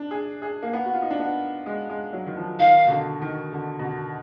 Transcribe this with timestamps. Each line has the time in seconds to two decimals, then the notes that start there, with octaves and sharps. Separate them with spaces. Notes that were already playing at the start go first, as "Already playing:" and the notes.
Already playing: D4
0.11 G#4
0.42 G#4
0.63 A#3
0.73 B3
0.85 F#4
0.94 F4
1.02 D#4
1.10 D4
1.20 B3
1.66 G#3
1.89 G#3
2.13 F#3
2.26 D#3
2.37 F3
2.59 D#3 F5
2.87 B2
2.90 D3
3.22 D#3
3.53 D3
3.79 B2
3.84 D3